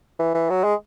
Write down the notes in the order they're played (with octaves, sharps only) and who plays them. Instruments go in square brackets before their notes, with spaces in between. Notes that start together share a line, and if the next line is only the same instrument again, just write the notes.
[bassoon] E3
E3
F#3
G#3